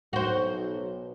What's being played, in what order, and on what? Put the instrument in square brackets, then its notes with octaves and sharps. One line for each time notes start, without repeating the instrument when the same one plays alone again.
[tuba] B1 [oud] F#4 C5